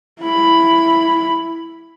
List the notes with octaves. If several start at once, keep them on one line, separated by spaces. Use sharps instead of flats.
E4 B5